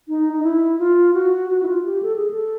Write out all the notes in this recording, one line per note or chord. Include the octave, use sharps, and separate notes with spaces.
D#4
D#4
E4
F4
F#4
F#4
E4
F4
G4
A4
G#4
A4